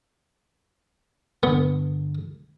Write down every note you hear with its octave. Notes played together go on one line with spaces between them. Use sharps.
G2 D3 B3